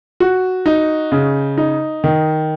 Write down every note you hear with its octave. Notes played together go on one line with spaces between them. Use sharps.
F#4
D#4
C#3
D#4
D#3